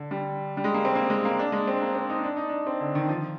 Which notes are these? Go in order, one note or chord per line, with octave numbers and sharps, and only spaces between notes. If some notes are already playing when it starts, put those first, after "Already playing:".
Already playing: D3
G3
G3
G#3
A#3
C4
A#3
G#3
A#3
D4
G#3
C4
A#3
C4
D#4
D4
D#4
D4
C4
D3
D#3
F3